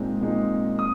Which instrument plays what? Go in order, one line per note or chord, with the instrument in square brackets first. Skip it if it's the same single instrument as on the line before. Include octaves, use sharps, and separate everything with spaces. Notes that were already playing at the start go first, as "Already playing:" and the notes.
Already playing: [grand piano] A#2 G#3 C4 D#4
A#2 G#3 C4 D#4
D#6